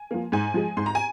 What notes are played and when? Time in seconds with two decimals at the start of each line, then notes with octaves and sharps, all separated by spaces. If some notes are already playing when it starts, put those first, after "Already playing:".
Already playing: G#5
0.11 F3 A#3
0.32 G#2 G#5
0.54 F3 G#3
0.77 G#2 C6
0.86 A#5
0.95 G#5